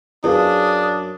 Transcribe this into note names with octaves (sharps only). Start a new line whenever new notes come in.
F#2 D4 G#4 B4 F5 D#6